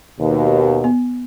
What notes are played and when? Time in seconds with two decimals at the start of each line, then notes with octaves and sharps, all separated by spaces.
0.20 D#2 B2
0.84 B3